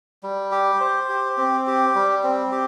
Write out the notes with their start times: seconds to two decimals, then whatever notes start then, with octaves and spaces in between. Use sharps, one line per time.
0.23 G3
0.52 G4
0.80 C5
1.09 G4
1.37 C4
1.67 G4
1.95 G3
2.24 C4
2.52 G4